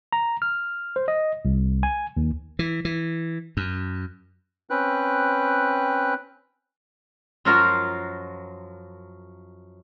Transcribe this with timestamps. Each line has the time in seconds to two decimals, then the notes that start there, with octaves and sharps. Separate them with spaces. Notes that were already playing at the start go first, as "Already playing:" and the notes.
0.13 A#5
0.42 F6
0.96 C5
1.08 D#5
1.45 C2
1.83 G#5
2.17 D#2
2.59 E3
2.85 E3
3.57 F#2
4.70 C4 C#4 B4 G5 F#6
7.45 F#2 F3 F4 F#4 A#4 F5